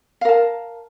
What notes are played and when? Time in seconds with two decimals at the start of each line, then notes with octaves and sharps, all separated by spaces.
0.21 F5
0.25 A#4
0.29 A5